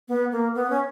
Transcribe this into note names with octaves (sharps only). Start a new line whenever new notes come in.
B3
A#3
B3
C#4